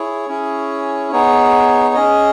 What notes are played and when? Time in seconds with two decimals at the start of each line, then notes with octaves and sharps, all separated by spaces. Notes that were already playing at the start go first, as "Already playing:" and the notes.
Already playing: E4 G#4 C#5
0.28 C#4 E4 G#4
1.12 B3 D#4 G#4 C#5
1.95 C#4 G#4 D#5